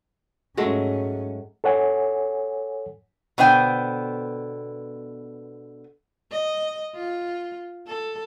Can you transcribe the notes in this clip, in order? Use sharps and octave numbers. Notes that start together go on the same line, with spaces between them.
G#2 F#3 G#3 A3 C#4
A4 C#5 F#5 G#5
B2 D3 B3 C5 G5 G#5
D#5
F4
A4